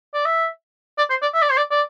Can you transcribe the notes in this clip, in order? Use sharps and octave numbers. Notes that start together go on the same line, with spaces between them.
D5
E5
D5
C5
D5
E5
D5
C5
D5
D5